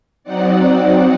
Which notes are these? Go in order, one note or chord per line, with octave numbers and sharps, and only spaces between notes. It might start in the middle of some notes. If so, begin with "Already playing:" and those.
F#3 C4 D#4 D5 F#5